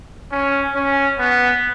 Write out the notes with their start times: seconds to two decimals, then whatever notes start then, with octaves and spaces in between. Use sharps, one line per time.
0.31 C#4
0.75 C#4
1.19 B3